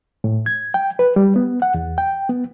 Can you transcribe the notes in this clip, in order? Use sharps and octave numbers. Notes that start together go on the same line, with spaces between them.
A2
G#6
G5
B4
G3
B3
F#5
E2
G5
B3